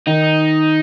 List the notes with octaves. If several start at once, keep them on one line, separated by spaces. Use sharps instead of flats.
D#3 D#4